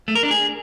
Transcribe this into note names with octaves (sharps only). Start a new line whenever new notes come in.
A3
A#4
D4
G#4